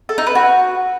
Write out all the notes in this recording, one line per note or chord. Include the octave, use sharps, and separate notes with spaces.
A4
D#4
B4
F#4